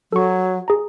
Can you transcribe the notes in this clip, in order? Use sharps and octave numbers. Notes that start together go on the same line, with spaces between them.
F#3 A4 C#6
G#4 A#5